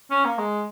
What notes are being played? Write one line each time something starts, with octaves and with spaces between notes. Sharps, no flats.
C#4
A#3
G#3